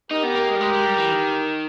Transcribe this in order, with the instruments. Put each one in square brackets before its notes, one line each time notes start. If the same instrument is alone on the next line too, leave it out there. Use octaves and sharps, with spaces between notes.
[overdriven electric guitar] D#4 [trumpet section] G4 A#4
[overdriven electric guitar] B3
A#3
G#3
G3
G#3
G#3
G3
E3
D#3